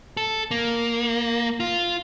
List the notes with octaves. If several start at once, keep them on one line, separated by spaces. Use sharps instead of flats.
A4
A#3
F4